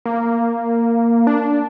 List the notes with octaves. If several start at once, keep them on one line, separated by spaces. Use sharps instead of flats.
A#3
D4